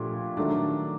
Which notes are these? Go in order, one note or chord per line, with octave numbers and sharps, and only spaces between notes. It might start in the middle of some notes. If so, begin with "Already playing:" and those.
Already playing: A#2 F3 A3 D4 G4
D#3 F#3 A3 D4